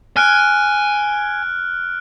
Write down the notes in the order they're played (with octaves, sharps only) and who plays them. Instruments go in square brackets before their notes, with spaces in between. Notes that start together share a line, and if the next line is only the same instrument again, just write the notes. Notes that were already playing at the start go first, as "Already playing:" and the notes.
[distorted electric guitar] G#5 [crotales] F6 F#6 D7